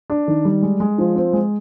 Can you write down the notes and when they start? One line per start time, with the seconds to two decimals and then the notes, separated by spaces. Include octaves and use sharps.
0.10 D4
0.28 D#3
0.45 G3
0.62 G#3
0.80 G#3
0.98 F3
1.15 C4
1.33 G#3